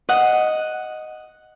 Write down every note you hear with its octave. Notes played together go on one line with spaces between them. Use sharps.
D#5 F#5